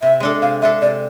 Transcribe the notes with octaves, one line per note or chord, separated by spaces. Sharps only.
C3 E5
G#3 D4 A4
C3 F5
G#3 D4 A4 E5
C3 D5